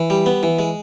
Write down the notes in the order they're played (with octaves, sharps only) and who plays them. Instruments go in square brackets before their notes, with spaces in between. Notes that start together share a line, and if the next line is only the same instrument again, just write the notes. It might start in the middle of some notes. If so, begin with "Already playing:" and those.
Already playing: [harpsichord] E3
G3
B3
E3
G#3